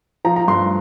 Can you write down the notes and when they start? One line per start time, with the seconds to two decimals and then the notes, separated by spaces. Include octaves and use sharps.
0.25 F3 A#5
0.36 A#5
0.48 G2 C6